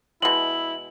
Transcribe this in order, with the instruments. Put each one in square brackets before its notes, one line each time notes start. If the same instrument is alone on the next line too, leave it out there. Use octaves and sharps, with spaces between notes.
[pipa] B2 G#3 [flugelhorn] E4 [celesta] F#7